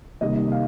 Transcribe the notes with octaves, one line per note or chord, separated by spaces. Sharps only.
C3 D#3 G3 A#3 D#5
F5